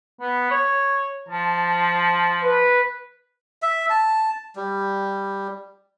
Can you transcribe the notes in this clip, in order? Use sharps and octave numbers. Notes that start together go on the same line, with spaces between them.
B3
C#5
F3 A5
B4
E5
A5
G3